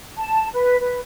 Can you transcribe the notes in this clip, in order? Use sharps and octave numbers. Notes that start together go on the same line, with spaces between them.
A5
B4
B4